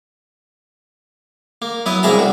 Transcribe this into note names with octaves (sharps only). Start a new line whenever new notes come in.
A#3
F#3 B3 E4 D#6
C2 A#3 G#4 E5 A#5 B5
C2 F#4